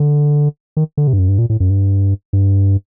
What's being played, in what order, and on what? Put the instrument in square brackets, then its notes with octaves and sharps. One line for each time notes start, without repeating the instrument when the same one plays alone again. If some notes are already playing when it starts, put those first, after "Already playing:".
Already playing: [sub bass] D3
D#3
D3
C3
G2
F#2
G2
A#2
A2
F#2
G2
G2